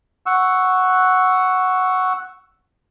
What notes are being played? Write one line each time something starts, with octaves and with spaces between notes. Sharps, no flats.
F#5 C#6 E6